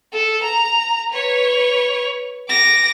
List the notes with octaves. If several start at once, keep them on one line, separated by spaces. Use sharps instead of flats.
A4
A#5
B4 C#5
D6 A#6